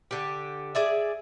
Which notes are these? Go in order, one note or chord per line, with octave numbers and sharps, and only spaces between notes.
D3 G4
G#4 D5 E5